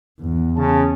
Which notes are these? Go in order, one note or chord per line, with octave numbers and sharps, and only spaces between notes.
E2
C#3 A5